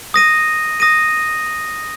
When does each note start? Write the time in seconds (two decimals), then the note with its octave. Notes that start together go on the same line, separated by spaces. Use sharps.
0.14 D#6 A#6 D#7
0.80 D#6 A#6 D#7